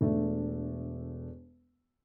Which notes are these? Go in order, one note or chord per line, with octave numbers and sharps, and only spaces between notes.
E1 A3 D4 E5